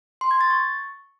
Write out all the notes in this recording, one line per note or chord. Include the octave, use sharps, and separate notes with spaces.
C6
G#6
A6
C#6